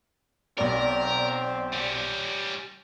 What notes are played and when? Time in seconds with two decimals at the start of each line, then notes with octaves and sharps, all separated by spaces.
0.58 B1 C4 A#4 D5
1.72 G3 C#4